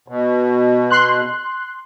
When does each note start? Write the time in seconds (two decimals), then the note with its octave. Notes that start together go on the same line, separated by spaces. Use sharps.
0.08 B2
0.91 C6 F#6